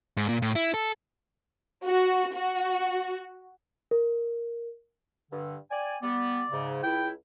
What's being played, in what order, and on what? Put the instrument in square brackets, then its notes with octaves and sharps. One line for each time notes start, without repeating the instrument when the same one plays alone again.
[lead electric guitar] G#2
A#2
A2
E4
A4
[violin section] F#4
F#4
[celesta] A#4
[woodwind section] G2 D3
D5 G5 G#5
[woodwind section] G3 B3 [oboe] D5
[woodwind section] G#2 C#3
[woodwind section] C#2 E4 [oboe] G5